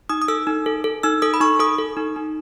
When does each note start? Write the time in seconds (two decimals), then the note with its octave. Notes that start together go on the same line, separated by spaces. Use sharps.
0.09 D#4 D#6
0.22 D#6
0.28 A4 E6
0.47 D#4
0.66 A4
0.84 A4
1.03 D#4 E6
1.22 A4 D#6
1.34 B5
1.41 D#4 C#6
1.59 A4 D#6
1.78 A4
1.97 D#4
2.16 D#4